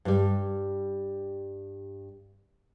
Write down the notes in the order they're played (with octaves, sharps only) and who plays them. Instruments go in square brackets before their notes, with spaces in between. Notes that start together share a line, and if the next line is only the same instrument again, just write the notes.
[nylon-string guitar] G2 G3